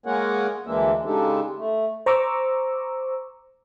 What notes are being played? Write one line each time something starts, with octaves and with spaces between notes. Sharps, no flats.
G#3 A#3 G#4 A#4 C#5 F#5
D2 E3 G#3 A#3 D4 E5
C#3 G#3 D4 D#4 G4 A4
A3
C5 A#5 C#6 D6 E6